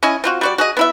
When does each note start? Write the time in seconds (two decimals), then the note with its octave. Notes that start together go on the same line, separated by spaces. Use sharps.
0.03 C#4 E4 D#5 G#5
0.24 C4 F4 F#4
0.41 G3 F#4 D5
0.58 F#4 G#4 D#5
0.77 B3 E4 E5